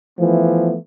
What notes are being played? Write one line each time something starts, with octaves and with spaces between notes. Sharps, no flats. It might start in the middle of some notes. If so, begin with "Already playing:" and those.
E3 F3 A3 B3